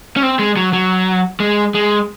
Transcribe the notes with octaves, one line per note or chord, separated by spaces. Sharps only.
C#4
C4
G#3
F#3
F#3
G#3
G#3